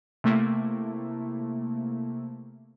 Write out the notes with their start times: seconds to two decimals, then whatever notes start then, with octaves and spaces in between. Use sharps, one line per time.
0.24 C3 A3 A#3 E4